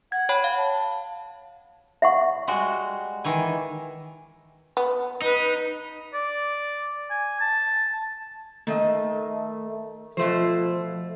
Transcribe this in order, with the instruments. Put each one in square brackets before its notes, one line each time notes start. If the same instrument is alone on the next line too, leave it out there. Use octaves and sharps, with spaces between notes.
[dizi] F#5 [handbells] G#6
[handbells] C#5 G5 B5
F5
[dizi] A5
[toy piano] E5 F#5 C#6
[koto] G3 G#3 F#4
D#3 E3 G#5
[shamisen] B3
[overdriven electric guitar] D#4 [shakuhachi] B4
[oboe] D5
G#5
A5
A5
[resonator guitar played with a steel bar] D#3 D#5 [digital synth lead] A3
[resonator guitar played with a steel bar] B2 A3 C5 [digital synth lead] F3